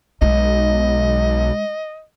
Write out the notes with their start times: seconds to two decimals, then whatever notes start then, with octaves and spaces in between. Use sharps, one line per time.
0.22 B1 G#3 D#4 D#5